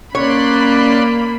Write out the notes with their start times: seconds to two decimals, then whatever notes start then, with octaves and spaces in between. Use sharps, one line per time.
0.15 A#3 C#4 C#5 D5 B5 C6 F#6